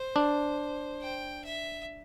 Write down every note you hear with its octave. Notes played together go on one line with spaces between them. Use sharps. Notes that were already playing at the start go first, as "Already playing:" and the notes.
Already playing: C5
D4
G5
E5